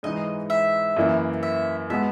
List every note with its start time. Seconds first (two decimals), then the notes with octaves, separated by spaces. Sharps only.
0.03 G#2 E3 G#3 D#4 D#5
0.50 E5
0.97 F#2 E3 A#3 E4
1.43 E5
1.90 B2 G#3 B3 F#4 E5